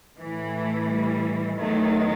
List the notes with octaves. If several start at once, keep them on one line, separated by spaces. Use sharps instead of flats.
A2 E3
A3
G3
E2 D#3 F#3 A3